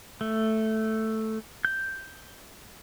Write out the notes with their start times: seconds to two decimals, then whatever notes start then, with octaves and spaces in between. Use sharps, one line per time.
0.21 A3
1.65 G6